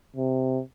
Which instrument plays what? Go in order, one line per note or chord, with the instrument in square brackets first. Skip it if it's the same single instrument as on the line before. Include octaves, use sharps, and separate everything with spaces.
[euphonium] C3